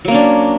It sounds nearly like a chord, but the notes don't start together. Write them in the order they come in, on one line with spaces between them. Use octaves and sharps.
F#3 A#3 C#4 D4